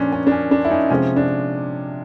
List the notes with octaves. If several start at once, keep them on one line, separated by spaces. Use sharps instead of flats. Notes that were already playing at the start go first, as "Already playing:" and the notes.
Already playing: A#2 F3 C#4 D4
C#4
D4
C#4
D4
E4
C#4 D#4
C3 F3 G#3 C#4
D4